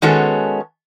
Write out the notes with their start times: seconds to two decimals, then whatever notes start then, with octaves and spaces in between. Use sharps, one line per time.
0.02 D#3 G#3 B3 C#4 F#4 A4